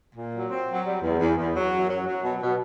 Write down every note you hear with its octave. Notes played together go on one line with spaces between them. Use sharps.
A#2
F#3
C4
F#3
G3
E2
E2
E2
F#3
F#2
F#3
F#3
B2
B2